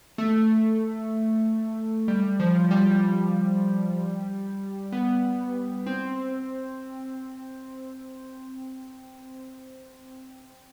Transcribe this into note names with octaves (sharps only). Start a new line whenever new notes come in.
A3
G3
F3
G3
B3
C4